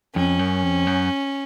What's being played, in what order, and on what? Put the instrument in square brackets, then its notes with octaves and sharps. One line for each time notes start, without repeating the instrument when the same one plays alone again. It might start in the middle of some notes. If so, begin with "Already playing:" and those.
[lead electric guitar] F2 [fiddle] C#4
[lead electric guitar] F#2
F2
F#2